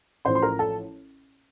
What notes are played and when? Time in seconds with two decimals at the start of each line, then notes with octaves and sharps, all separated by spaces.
0.25 A1 A2 F3 C5 C6
0.35 C6
0.42 A#4 A#5
0.59 A4 A5